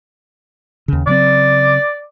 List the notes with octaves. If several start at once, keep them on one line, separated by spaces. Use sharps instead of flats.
D#2 C#3
C#3 F#3 C4 D5